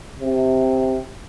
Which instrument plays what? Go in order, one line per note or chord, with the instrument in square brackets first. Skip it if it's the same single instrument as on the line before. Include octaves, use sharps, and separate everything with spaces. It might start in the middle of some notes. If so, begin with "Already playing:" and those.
[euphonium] C3